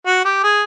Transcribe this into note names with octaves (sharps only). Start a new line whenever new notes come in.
F#4
G4
G#4